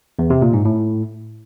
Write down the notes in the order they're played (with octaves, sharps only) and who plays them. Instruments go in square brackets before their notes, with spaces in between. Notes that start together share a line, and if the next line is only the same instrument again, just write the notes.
[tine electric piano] E2
C3
A#2
G#2
A2